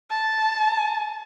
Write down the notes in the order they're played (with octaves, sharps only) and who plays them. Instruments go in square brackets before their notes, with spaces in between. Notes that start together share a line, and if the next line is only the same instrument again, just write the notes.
[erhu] A5